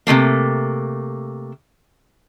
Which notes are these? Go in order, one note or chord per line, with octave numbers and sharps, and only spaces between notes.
C3 E3 A3 A#3